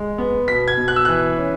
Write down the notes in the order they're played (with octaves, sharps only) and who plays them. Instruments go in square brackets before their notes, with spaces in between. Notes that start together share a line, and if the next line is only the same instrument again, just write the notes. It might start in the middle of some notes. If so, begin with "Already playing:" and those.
Already playing: [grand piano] G#3
B3
B2 B6
G#6
B2
F#6
E6
E3 F#6
C#4